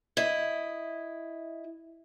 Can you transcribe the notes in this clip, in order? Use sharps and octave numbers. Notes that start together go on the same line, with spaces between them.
E4 D#5